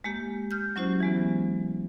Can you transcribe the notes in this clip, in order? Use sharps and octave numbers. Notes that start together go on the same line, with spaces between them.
G#3 A#3 G4
F6 G6
F#3 C#4 E4 F#4 G4 C5
E3 G#3 B3